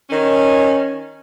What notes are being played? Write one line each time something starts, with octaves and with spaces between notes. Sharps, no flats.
D#3 C#4